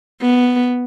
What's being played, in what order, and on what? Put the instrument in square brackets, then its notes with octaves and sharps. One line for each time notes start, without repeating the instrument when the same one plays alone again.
[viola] B3